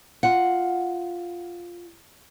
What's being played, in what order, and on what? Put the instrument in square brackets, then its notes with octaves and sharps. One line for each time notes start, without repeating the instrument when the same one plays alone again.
[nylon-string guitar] F4 F#5